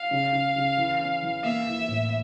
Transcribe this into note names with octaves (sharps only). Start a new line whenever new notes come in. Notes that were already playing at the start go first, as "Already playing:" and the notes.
Already playing: F5
C#3
C#3
C#3
E3
C#4
E3
A#3 E5
E3
A2